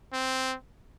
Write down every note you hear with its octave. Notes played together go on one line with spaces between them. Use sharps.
C4